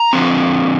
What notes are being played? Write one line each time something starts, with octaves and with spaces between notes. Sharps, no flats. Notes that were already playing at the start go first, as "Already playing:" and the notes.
Already playing: A#5
D3 F3 C4